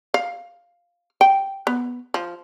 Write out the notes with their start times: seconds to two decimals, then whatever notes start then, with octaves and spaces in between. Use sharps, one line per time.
0.14 F5
1.21 G5
1.67 B3
2.14 F3